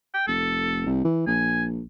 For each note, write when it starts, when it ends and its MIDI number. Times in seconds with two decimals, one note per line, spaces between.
0.14 0.27 79
0.27 0.83 29
0.27 0.91 69
0.86 1.00 36
1.05 1.22 52
1.27 1.82 34
1.27 1.63 80